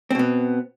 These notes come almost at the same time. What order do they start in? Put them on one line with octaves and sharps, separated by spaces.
C4 B2 B3